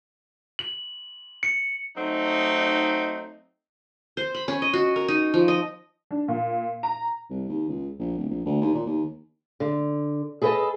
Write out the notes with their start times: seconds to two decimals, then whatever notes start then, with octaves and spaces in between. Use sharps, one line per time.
0.59 F#7
1.43 C#7
1.96 F#3 A3 C4 D#4
4.17 C5
4.34 B5
4.48 C#4
4.62 D#5
4.73 F#4
4.96 A#4
5.08 D#4
5.34 F3
5.48 D#5
6.11 D4
6.28 A#2
6.83 A#5
7.30 C2
7.49 D#2
7.69 C#2
7.99 A#1
8.18 D1
8.29 A#1
8.45 D2
8.61 D#2
8.74 A#2
8.86 D#2
9.60 D3
10.42 G#4 A4 B4 C#5 D#5 A5